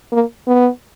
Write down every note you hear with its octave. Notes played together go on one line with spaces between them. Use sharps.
A#3
B3